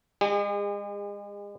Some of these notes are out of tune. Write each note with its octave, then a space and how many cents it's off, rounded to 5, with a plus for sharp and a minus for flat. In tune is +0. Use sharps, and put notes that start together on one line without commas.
G#3 -35 G#4 -45